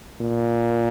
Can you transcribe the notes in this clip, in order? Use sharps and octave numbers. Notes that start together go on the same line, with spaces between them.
A#2